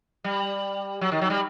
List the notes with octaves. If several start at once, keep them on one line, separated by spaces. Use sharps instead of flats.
G3
F#3
D#3
F#3
G3